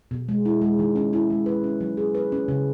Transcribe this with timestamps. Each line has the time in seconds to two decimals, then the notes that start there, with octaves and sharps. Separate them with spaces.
0.11 B2
0.29 G#3
0.45 E4
0.62 G#3
0.79 D#3
0.96 C#4
1.13 E4
1.30 G#3
1.46 B4
1.64 C#4
1.81 F#3
1.97 G#4
2.15 B4
2.32 C#4
2.48 C#3